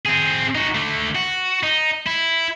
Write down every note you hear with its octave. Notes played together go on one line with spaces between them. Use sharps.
C4 G#4
D#4 F#4
D3 A3
F#4
D#4
E4